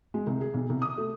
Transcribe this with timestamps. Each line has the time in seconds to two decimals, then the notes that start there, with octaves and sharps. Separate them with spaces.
0.14 G#3
0.27 C2
0.41 G#4
0.54 B1
0.69 C2
0.82 D#6
0.98 A3